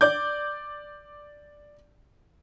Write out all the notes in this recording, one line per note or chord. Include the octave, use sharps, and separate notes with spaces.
D5 D6 G6